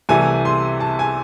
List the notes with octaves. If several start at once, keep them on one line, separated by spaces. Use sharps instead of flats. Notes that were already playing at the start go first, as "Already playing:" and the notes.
C2 C3 E3 A3 G#5
C6
A5
G#5